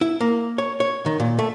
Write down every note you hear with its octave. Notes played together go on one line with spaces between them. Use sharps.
E4
A#3
C#5
C#5
D#3
A#2
A3